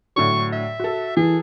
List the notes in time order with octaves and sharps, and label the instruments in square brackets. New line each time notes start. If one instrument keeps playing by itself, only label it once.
[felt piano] A2 D3 F#3 [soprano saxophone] C#6
[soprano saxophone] E5
[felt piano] F#4 A4
[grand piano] E3 [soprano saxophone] G#4